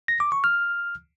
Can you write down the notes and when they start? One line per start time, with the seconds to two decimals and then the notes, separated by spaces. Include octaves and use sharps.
0.08 A#6
0.20 D6
0.32 C#6
0.44 F6